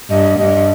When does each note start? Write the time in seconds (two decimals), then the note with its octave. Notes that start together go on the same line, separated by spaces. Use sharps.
0.10 G2 D#5
0.39 G2 D#5